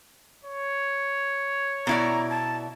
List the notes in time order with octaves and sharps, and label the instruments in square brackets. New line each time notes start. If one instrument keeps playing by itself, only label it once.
[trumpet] C#5
[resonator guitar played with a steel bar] B2 E4 D5 [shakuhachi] A#5
[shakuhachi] A5